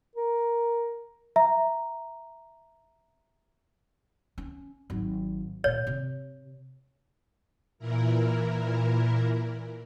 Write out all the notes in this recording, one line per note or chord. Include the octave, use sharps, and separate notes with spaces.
A#4
E5 A#5
C#4
G#1 F#3
A#2 F4 C#5
C3
A#2 E3 E4 A#4